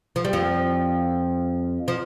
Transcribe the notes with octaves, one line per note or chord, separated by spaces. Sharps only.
F3
G3
F2 F3
F3